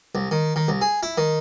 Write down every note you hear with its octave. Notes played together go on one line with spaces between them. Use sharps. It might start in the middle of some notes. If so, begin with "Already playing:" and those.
C2
D#3
D#3
C2
G#4
E4
D#3